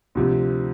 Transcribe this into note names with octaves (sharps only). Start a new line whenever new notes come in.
D2 C3 F3